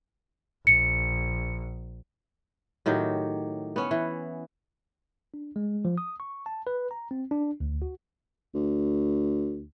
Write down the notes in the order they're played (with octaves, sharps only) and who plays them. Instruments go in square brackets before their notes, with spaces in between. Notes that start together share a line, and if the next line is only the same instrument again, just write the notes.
[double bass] A#1 [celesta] C#7
[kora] A2 D#3 F#3 G4
B3 C#4
E3
[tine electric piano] D4
G#3
F3
D#6
C#6
A5
B4
A#5
C4
D4
D2
F#4
[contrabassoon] D2